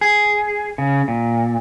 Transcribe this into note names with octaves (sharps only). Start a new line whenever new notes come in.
G#4
C#3
A#2